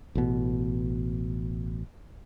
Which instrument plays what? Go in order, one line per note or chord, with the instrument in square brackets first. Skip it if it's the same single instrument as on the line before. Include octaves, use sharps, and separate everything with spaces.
[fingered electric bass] A1 B2